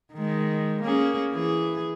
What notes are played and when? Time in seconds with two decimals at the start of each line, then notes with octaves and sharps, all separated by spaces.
0.14 D#3 G#3
0.82 A#3 C#4 G#4
1.33 E3 G#4